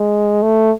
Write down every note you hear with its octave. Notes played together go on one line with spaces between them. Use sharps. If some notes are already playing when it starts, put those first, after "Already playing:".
Already playing: G#3
A3